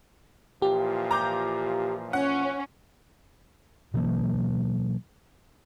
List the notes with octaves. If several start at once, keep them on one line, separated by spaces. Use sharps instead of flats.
A#2 E3 F3 G4
A#5 D6 G6
C#4 F#5
B2 E3 F#3 A#3